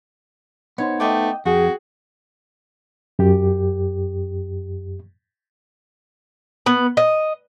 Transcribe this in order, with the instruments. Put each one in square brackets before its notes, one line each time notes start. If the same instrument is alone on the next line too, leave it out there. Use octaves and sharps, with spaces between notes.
[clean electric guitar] B3 D#4 C5 [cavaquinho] C#5
[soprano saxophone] A3 [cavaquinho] D#5 G5 D6
[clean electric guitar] F2 [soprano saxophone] F#4 [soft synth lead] G#4 [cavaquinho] G5
[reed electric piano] F#2 G4
[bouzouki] B3
D#5